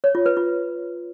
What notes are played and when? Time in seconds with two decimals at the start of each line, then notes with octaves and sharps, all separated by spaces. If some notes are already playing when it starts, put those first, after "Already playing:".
0.04 C#5
0.15 F4
0.26 B4
0.37 F4